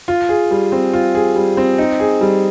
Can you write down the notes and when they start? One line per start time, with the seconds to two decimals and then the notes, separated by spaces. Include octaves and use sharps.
0.08 F4
0.29 G#4
0.51 G3
0.72 C4
0.93 F4
1.15 G#4
1.36 G3
1.57 C4
1.78 D#4
2.00 G#4
2.21 G3